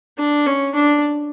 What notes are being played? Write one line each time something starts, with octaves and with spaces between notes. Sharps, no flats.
D4
C#4
D4